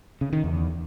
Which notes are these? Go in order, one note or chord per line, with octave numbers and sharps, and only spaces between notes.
C#3
D#3
E2